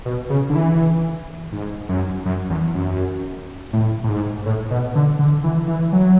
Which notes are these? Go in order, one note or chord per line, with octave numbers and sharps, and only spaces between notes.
B2
C#3
D3
E3
G#2
F#2
F#2
E2
F#2
A2
A2
G#2
A2
B2
D3
D3
E3
E3
F#3